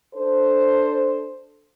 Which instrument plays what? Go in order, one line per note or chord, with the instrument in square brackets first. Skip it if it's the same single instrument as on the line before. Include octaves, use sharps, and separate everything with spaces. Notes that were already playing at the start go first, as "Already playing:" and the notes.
[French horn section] D4 A4 C5